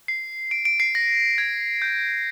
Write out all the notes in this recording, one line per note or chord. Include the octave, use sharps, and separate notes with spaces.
C7
D7
D7
C7
A#6
G#6
G6